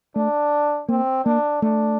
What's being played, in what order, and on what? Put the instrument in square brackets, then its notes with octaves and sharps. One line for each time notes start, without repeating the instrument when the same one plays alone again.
[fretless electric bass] A3 [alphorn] D4
[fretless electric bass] A#3 [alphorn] C4
[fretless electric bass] A#3 [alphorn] D4
[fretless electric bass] A3 [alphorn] D4